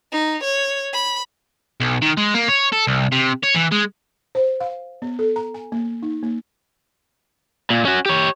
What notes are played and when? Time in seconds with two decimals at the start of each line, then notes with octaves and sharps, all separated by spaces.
0.12 D#4
0.43 C#5
0.93 B5
1.80 B1
2.02 D#3
2.17 G#3
2.34 A#3
2.48 C#5
2.72 A4
2.87 C2
3.12 C3
3.43 C#5
3.55 E3
3.72 G#3
4.35 C5
4.60 F5
5.02 B3
5.19 A4
5.36 A#5
5.54 G#5
5.72 A#3
6.03 D#4
6.23 A#3
7.70 A#2
7.85 C#4 F#4
8.06 G4 C#5